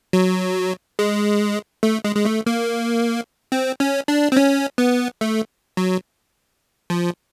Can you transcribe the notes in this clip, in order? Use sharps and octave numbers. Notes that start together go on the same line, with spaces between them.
F#3
G#3
A3
G#3
G#3
A3
A#3
C4
C#4
D4
C4
C#4
B3
A3
F#3
F3